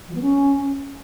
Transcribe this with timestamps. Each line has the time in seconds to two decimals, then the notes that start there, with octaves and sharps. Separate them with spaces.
0.09 F3
0.15 B3
0.22 C#4